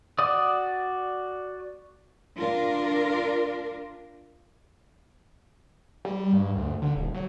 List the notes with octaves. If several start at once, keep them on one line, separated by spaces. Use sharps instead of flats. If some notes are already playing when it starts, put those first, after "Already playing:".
F#4 D5 D6 D#6
D4 F4 A#4
G3
G2
D2
D3
D#1
F#3